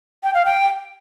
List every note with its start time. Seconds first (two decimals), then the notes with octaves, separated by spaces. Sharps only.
0.23 G5
0.34 F5
0.45 G5